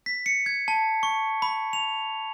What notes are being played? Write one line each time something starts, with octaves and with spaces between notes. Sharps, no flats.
B6
C#7
G#6
A5
C#6
B5
F7